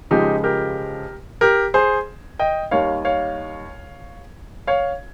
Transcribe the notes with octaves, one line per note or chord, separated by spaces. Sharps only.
C#2 C#3 F3 G#3 D#4 G4
G4 A#4
G4 A#4
G#4 C5
D#5 G5
D#2 D#3 G3 C#5 F5
C#5 F5
C#5 F5